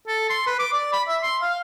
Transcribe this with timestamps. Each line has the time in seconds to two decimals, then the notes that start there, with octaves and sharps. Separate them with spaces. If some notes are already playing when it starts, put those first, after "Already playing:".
0.08 A4
0.30 C6
0.47 B4
0.59 D6
0.73 D5
0.93 B5
1.08 E5
1.23 C6
1.41 F5